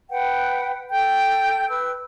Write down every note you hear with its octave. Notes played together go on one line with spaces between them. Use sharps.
B4 F#5 G5
A4 G5 G6
B4 E6